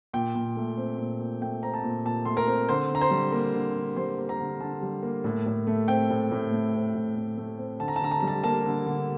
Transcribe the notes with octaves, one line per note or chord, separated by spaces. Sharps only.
A#2 G5
A#2
A3
C4
A#2
A#2
A3 G5
C4 A#5
A5
A#2
A#2 A5
A3 C6
A#4 A#5
C4
D3 C5 C6
D3 A#5
C5 C6
G3
A#3
D3
D3
G3 C5 C6
A#3
A#4 A#5
D3
D3 A5
G3
A#3
A2
A2
A3
C4 G5
A2
A2
A3
C4
A2
A2
A3
C4
D3 A5
A#5
A5
D3 A#5
A5
G3 A#5
A5
A#3 A5
D3
D3